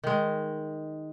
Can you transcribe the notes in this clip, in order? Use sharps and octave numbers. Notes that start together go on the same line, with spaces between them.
D#3 G#3